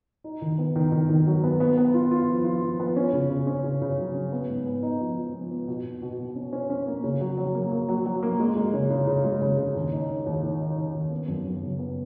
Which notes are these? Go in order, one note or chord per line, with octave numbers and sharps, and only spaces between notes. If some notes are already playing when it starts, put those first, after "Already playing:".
D#4
D#3
B3
D#3
D#3
D#3
F#3
B3
B3
B3
F4
F4
F3
F4
F3
B3
C#4
C#3
C#3
C#4
C#3
C#3
F#3
C#4
B3
G#2
B3
D#4
F3
F3
B3
B3
B2
B2
B2
B2
C#4
C#4
C#4
A#3
C#3
F#3
F#3
A#3
A#3
F#3
F#3
A#3
G#3
G#3
C#3
C#3
C#3
G#3
C#3
C#3
D#2
D#4
D#4
D#2
D#3
D#4
D#3
D#2
B3
F#2
F#2
C#3
B3